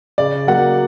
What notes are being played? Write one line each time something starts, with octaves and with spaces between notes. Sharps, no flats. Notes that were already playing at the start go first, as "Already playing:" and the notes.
C#3 D5
F#3 A#3 F#5